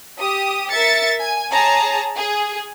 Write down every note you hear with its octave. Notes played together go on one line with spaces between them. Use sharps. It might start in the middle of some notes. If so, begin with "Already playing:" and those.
G4 D#6
A#4 E5 A6 C#7
G#5
G#4 C#5 A5 A#5
G#4